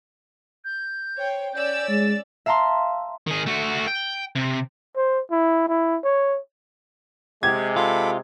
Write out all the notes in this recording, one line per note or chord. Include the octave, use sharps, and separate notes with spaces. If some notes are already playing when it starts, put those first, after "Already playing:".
G6
C5 C#5 G5
C#4 D5 E6 G6
G#3 A6
E5 F5 A5 A#5 C6
D#3 G#4
A3 F#4
G5
C3
C5
E4
E4
C#5
C3 G#3 G4 G#6
F4 A4 B5 D6